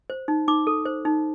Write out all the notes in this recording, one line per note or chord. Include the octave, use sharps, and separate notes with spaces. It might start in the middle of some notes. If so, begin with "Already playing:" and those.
C5
D#4
D#4 D6
A4
C5
D#4